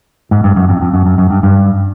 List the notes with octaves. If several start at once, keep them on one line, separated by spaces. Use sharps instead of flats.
G#2
G2
F#2
F2
F2
F#2
F#2
F#2
G2
G2